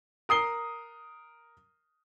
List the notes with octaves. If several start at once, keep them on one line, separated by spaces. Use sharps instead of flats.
A#4 D#6 C7 G7